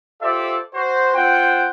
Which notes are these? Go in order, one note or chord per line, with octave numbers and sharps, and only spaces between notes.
F4 G4 A4 C5 D5 E5
F#4 C5
C4 F4 C5 F#5 G5